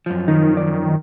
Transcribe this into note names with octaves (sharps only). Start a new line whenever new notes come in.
F#2 F3
D#3 D#4
D5